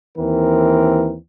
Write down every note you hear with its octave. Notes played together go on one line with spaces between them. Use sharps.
D#2 E3 C4 A#4